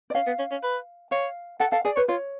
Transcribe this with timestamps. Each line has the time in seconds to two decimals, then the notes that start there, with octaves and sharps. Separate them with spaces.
0.10 D5
0.15 C#4 F5
0.27 B3
0.39 C#4
0.51 C#4
0.63 B4
1.11 C#5 F5
1.60 A4 F#5
1.72 A4 F5
1.85 G#4 D5
1.96 B4 C#5
2.09 F4 C#5